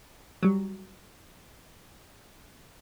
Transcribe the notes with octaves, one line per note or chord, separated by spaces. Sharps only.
F#3 G3